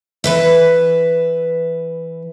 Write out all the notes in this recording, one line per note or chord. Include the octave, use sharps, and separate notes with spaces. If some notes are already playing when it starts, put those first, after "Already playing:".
E3 B4 E5